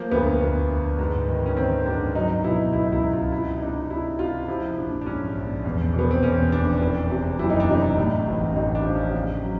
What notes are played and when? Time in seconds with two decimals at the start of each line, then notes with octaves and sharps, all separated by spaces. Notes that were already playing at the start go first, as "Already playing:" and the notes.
Already playing: F3 A#3
0.11 D2 B3
0.41 D2
0.69 D2
0.99 G#2
1.28 D#3
1.46 C#4
1.57 D#3 C4
1.86 G#2 D4
2.15 F#3 D#4
2.44 B2 E4
2.73 C#2 E4
2.84 D#4
2.92 E4
3.03 C#2
3.13 F4
3.32 C3 E4
3.56 D#4
3.61 C3 D4
3.90 C3 E4
4.19 C3 F4
4.48 F3 E4
4.77 A#1 D4
5.01 D4
5.06 G#2 C#4
5.36 A#1
5.64 E2
5.94 B2
5.99 B3
6.11 C4
6.23 E2 C#4
6.52 F1 D4
6.81 E3
7.10 C3
7.39 F#1 E4
7.50 D#4
7.60 D4
7.69 C3 D#4
7.98 A2
8.27 A1
8.55 A1 D#4
8.75 D4
8.85 F3
8.95 C#4
9.14 C#3
9.43 F#3